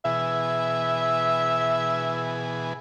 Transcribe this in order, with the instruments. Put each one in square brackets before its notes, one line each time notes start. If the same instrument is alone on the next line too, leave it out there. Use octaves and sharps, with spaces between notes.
[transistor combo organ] B2 E3 G#4 [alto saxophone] E5